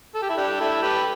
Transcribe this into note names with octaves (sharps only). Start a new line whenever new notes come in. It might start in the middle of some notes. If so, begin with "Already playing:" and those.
A4
G4
E4
D4 G4
E4 A4
G4 B4